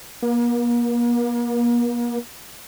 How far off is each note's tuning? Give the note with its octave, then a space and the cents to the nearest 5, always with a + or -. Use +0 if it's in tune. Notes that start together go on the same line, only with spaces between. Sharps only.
A#3 +40